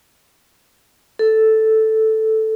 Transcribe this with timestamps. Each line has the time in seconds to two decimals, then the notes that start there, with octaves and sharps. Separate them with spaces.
1.19 A4